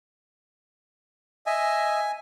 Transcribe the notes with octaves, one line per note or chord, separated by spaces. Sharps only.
D#5 E5 G#5